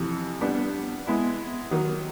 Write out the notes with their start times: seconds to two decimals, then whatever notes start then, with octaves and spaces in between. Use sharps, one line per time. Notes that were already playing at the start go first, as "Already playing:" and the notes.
Already playing: F2 C3 E3
0.41 G3 B3 D4
1.06 G#3 B3 E4
1.71 D#3 F#3 A#3